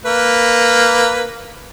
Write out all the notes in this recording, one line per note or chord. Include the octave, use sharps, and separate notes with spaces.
A#3 B4